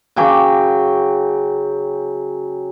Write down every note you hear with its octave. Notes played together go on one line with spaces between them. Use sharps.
C#3 F#3 G5 D6